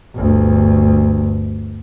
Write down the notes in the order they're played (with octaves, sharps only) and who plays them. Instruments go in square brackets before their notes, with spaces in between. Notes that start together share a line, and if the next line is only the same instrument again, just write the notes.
[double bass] G1 D2